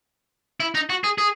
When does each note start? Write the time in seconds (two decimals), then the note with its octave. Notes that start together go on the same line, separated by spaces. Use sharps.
0.60 E4
0.75 D#4
0.90 F#4
1.04 G#4
1.18 G#4